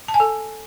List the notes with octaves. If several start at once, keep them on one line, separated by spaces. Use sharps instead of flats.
A5
G#5
A4